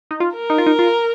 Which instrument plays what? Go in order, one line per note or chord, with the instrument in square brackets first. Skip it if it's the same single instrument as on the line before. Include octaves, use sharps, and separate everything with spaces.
[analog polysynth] D#4
F4
[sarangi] A#4
[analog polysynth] D#4
F4
D#4
F4